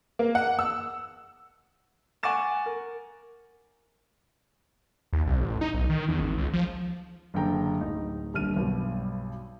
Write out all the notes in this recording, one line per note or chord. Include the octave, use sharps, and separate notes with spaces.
A#3
F#5
E6
F#5 G#5 C#6 D6 A6 E7
A#4
D#2
C2
A1
D#4
B1
D#3
E2
G#1
C#2
F3
F#1 D3 G5 A#5
D1 D#4
D#1 C2 D3 F6 D#7
B1 G2 B2